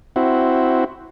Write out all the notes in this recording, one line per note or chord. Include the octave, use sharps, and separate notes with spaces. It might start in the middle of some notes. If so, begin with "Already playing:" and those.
C4 E4 F#4